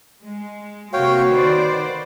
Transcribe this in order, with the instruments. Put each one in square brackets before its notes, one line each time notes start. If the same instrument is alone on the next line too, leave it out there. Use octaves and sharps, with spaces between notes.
[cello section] G#3
[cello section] C3 A#3 [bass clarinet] F#4 [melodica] C#5 F5 G5
[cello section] D#3 C5 D5 [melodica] B4